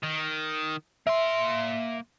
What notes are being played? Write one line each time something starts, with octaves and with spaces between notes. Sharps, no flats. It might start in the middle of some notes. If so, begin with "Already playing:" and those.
D#3
A#3 E5 C6